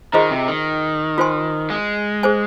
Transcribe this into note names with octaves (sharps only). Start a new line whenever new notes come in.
D#3 F4 G#4 C5 D#5 A#5
C3
D#3
F4 C5 G#5 C6
G#3
G#4 C5 G#5